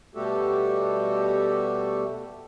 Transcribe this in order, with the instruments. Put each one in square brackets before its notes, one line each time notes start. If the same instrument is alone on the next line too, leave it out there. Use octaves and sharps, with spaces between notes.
[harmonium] B2 G3 A3 F#4 G4 A4